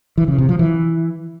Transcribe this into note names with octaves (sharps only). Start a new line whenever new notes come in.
E3
C#3
C3
F3
E3